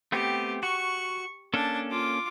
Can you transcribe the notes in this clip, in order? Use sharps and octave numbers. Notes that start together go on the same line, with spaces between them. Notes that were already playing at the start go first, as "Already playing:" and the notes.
A3 B3 C4 G4
F#4 C#6
A#3 C#4 D4 A4 A5
F4 D6